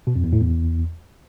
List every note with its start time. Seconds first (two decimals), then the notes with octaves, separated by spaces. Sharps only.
0.07 B2
0.16 F2
0.24 E2
0.33 A2
0.41 E2